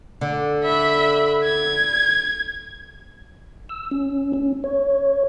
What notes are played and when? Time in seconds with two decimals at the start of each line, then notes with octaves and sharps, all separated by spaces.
0.21 D3
0.64 E5 B5
1.44 G#6
3.69 E6
3.91 C#4
4.33 C#4
4.64 C#5